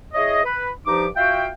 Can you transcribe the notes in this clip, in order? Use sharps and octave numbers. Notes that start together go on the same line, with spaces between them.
E4 G#4 C#5 D#5
B4
G2 F3 D#4 G4 D6
F4 F#4 E5 F5 G5